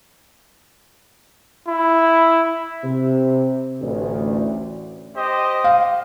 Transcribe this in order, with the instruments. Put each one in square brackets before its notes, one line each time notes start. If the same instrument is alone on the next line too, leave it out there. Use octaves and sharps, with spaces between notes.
[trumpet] E4
[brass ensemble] C3
A1 D2
[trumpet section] G4 C5 D#5
[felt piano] F5